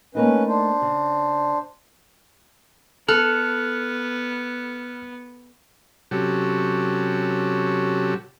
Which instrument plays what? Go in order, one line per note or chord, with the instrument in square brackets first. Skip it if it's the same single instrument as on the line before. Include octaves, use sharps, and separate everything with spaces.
[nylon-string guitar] A3 A#3 D#4 [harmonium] C#4 B4
[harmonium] D4 C5
[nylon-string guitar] C#3
[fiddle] B3 [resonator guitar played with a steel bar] A4 [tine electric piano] F6 F#6
[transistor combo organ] C3 F#3 C#4 F#4 G4 A4